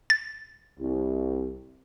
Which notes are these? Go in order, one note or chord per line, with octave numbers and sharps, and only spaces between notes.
A6
C2